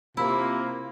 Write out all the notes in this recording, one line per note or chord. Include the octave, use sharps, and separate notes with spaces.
C3 A#3 E4 F4